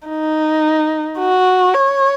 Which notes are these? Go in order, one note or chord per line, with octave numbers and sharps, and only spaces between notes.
D#4
F#4
C#5